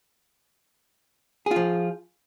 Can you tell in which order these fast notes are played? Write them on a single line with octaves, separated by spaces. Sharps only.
G#4 F4 F3